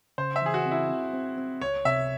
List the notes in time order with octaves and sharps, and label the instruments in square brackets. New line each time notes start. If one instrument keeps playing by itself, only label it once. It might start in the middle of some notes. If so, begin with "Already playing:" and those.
[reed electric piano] C#3 [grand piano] C5
[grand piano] E5
[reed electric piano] E3 [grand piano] G#4
[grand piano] F#4
[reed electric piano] C4
[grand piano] E4
[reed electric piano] C4
C4
C4
[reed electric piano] C#2 [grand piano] C#5
[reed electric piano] C3 [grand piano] E5